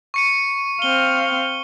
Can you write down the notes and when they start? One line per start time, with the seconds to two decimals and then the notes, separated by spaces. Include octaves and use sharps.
0.14 C#6 C#7 D#7
0.82 C4 F5 G7